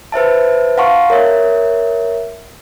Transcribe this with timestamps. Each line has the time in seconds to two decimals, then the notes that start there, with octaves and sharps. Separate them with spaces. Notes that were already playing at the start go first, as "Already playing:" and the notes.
0.12 B4 C5 E5 A5
0.78 F5 F#5 A5 C6 C#6
1.10 A#4 C#5 E5